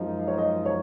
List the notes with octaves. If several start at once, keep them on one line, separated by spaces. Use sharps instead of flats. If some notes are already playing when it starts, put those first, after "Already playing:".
Already playing: F#2 F3 G#3 D#4
C#5
D#5
C#5